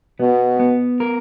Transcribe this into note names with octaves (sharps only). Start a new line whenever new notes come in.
B2 B3
B3
A#4